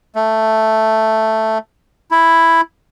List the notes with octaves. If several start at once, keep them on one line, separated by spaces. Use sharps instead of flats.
A3
E4